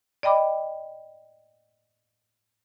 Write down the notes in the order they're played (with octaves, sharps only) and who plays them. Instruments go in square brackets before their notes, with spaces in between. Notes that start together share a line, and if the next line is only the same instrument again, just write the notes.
[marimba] D5 D#5 G5 B5 D6